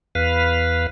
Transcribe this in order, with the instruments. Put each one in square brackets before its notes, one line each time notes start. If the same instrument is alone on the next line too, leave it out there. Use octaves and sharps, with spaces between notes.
[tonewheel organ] E2 B4 F5